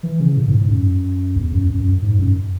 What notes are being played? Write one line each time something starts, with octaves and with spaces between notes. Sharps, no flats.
E3
C#3
A2
G#2
G#2
F#2
E2
F#2
F#2
F#2
G#2
F#2